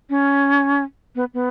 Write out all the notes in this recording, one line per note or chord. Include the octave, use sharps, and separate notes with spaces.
C#4
B3
B3